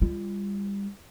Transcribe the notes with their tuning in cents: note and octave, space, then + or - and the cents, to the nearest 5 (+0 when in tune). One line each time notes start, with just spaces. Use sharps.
G3 +30 F4 -25